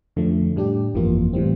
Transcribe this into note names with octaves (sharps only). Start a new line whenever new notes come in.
F2 D3 F3 A3
A2 G3 D4 G4
G1 F2 E3 A#3 F4
A2 E3 G3 C4